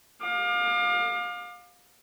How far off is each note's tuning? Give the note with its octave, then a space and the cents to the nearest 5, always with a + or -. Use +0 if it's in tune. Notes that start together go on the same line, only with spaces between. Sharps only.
F5 +30 D6 +35